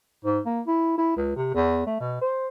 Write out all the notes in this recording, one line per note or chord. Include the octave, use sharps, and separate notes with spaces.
G#2
A#3
E4
E4
C#2
C3
E2
A3
B2
C5